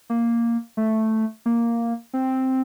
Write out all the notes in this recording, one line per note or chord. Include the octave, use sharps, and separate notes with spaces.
A#3
A3
A#3
C4